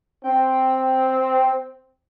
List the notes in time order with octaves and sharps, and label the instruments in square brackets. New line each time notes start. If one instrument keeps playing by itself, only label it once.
[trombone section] C4 [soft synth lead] G5